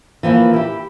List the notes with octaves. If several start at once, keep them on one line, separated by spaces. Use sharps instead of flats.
E3 F3 A#3 B4
E4 G4